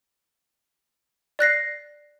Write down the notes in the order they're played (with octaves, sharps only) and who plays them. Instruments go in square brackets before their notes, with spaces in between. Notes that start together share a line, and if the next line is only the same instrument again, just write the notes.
[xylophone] D5 F#6 A#6 C7